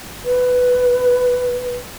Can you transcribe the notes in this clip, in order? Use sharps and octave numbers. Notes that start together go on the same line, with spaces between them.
B4